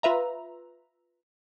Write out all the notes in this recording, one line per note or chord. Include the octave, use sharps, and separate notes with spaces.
F4 B4 E5 A#5